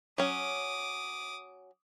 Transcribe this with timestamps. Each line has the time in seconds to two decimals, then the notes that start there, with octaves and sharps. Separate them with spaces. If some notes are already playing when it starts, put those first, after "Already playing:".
0.18 F#3 C#4 D6 D#6